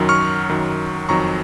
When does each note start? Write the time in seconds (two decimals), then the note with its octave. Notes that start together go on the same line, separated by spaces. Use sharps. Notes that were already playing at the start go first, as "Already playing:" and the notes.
Already playing: F#2 D#3 F#3
0.09 C#6 F6
0.49 F#2 D#3 F#3
1.09 F2 D#3 F#3 A#5 C#6